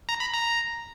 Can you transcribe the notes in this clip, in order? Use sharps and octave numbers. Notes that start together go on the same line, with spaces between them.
A#5
B5
A#5